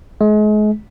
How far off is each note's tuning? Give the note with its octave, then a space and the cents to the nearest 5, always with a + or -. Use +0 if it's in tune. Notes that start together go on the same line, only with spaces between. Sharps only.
G#3 +35